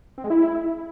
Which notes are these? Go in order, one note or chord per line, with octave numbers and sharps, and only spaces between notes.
C4
G#3
E4